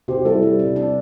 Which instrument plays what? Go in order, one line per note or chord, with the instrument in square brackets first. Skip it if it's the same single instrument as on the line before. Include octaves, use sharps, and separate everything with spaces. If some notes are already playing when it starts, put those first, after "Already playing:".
[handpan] C3 [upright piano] G4 C5
[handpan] G3 [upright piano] E4 A4
[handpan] G3
C3
D4